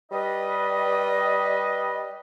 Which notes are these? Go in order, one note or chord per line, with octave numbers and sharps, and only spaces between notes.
G3 B4 D#5